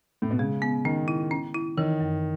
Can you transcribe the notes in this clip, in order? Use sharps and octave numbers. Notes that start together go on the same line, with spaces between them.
A2
B2
C#3 G#3
B3
D#3 C#4
E4
C#4
E4
D#3 E3
F#2